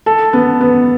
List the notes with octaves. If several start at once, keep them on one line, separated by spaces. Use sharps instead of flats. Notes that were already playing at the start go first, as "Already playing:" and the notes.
A4
B3
B3